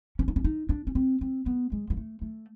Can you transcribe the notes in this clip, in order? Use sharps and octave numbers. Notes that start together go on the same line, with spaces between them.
C#4
D4
C#4
D#4
D4
C#4
C4
C4
B3
G#3
G#3
A3
A3